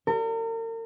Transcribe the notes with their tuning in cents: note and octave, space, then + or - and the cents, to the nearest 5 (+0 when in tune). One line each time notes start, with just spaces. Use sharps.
A#4 -40